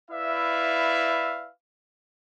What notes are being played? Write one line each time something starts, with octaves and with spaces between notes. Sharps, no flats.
E4 B4 D5 E5 F5